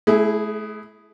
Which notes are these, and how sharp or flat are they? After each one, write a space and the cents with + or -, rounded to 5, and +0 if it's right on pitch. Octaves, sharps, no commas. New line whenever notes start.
A3 -40 E4 +0 G#4 +0